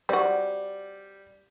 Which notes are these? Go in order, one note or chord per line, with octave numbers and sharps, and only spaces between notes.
G3 C4 F#4